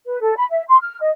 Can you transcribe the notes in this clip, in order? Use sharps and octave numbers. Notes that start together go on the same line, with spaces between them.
B4
A4
B5
E5
C6
F6
D#5